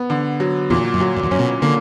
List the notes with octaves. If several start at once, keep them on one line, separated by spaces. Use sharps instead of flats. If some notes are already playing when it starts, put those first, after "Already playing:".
Already playing: B3
D3
F#3
E2 A#2
F#2
F#3
F#2
E2
F#2 C#4
B2
D3 A#3